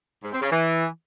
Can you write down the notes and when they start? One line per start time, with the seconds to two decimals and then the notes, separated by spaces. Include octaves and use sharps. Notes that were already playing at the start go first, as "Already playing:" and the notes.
0.23 G#2
0.32 C4
0.41 C#3
0.51 E3